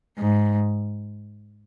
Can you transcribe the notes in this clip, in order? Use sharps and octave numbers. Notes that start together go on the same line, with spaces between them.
G#2